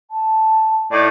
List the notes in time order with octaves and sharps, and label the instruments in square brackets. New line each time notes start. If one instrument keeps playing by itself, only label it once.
[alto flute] A5
[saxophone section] A2 D#4 D5